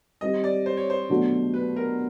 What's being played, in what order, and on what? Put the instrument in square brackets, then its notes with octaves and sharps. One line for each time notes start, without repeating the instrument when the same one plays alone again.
[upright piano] G3 C4 D#4 G4 [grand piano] D#5
[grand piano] D5
C5
C#5
C5
[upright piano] B2 F#3 A3 D4
[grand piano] B4
A#4